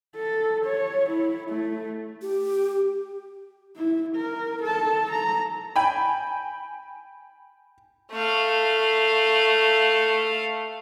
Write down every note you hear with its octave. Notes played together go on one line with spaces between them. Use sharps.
A4
C#5
E4
A3
G4
E4
A#4
A4 A5
A#5
G5 G#5 B5
A3 F5